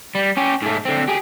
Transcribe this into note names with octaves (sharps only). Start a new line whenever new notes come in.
G3
C#4 G4
G#2 A3
D3 C4
G4 G#4